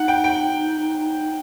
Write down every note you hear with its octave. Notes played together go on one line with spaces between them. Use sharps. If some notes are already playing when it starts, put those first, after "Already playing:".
Already playing: D#4 F#5
G5
G5